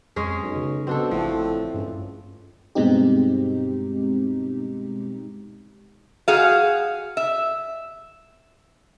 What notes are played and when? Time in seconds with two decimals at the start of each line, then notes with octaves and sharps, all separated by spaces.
0.16 F2 G#3 C#4 G#4
0.43 B1
0.56 C#3
0.87 B2 C4 D4 A4
1.11 A1 A2 F3
1.74 C#2 G2
2.75 G2 B2 G#3 C4 D#4 G4
6.28 F#4 G#4 F5
7.17 E5